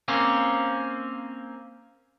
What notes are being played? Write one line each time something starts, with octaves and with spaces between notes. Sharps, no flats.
A#3 C4 C#4